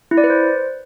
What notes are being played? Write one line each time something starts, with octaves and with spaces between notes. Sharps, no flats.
E4
D5
B4
C5